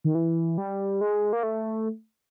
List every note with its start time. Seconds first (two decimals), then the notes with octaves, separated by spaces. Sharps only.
0.04 D#3
0.15 E3
0.58 G3
1.01 G#3
1.33 A#3
1.43 A3